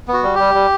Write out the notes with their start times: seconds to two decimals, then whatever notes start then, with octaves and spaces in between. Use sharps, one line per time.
0.08 B3
0.13 F#4
0.23 G3
0.35 G3 G4
0.55 G3